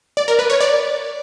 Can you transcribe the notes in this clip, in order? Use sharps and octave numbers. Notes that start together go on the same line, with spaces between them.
D5
A#4
B4
C#5
D5